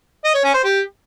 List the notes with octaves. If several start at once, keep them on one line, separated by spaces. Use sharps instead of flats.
D#5
C#5
C#4
C5
G4